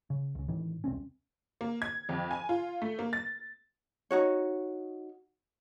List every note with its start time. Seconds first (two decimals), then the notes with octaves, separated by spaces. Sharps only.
0.10 C#3
0.35 C#2 C#3
0.48 A2 D#3 E3
0.84 E1 C2 C4 C#4
1.61 A#3
1.82 G#6
2.09 F2
2.31 G#5
2.49 F4
2.82 A3
2.99 A#3
3.13 A6
4.11 D#4 F#4 C#5